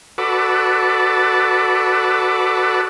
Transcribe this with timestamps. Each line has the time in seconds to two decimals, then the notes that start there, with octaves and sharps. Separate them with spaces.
0.18 F#4 A4 B4 D5